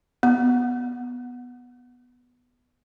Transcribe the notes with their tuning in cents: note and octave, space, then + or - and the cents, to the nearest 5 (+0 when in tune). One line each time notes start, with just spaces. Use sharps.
B3 -5